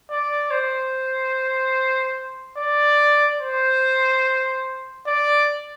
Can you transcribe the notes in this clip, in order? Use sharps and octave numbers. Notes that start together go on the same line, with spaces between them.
D5
C5
D5
C5
D5